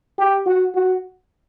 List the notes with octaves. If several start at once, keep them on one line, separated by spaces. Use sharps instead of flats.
G4
F#4
F#4